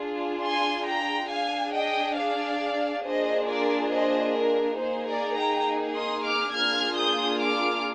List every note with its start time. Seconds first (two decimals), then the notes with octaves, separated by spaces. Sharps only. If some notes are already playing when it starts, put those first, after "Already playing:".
Already playing: D4 F4 G#4
0.42 G#5 C6
0.86 G5 A#5
1.29 D4 G#4 F5 G#5
1.73 D#5 G5
2.17 D5 F5
3.04 A#3 D4 F4 G#4 C5 D#5
3.48 A#4 D5
3.91 C5 D#5
4.35 A#4
4.79 A#3 D#4 G#4 C5
5.08 A#4 D5
5.36 G5 A#5
5.95 C6 D#6
6.24 D6 F6
6.53 A#3 D4 F4 G#4 F6 G#6
6.97 D#6 G6
7.40 D6 F6